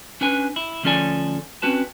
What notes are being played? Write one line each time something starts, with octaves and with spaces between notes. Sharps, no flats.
C#4 D4 B4 G#5
E4
D2 F3 C#4 A4 D5 G#5
C4 C#4 F#4 B4 A5